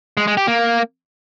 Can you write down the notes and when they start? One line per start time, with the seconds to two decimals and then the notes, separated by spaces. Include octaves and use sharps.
0.17 G#3
0.27 G#3
0.37 G4
0.47 A#3